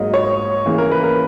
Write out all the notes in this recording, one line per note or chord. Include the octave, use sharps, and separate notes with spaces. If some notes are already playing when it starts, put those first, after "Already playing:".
Already playing: G#2 F#3 A#3 D#5
C#5
C#3 E3 A#3
A#4
B4
A#4